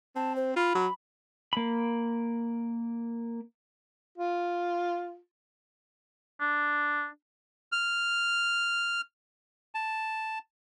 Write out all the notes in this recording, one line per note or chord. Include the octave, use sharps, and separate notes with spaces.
C4 A5
C5
F4 B5
F#3
A#3 B5
F4
D4
F6
A5